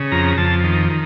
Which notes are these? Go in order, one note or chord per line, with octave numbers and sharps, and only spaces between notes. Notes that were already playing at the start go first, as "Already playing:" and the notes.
Already playing: C#3
F2 A#5
F2 A5
D#3
D#3